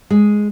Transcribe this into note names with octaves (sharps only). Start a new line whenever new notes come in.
G#3